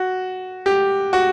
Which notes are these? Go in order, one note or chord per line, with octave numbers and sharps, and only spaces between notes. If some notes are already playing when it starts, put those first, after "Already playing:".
Already playing: F#4
G4
F#4